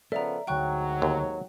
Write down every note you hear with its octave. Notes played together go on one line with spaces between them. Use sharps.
C#3 F3 B3 A4 A#4 D5 E5 A#5
D2 G#2 F#3 F#5 G5 C#6 F#6
D#2